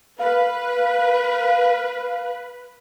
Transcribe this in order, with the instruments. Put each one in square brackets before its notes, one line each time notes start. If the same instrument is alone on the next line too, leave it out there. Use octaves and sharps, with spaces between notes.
[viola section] B4 [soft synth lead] F5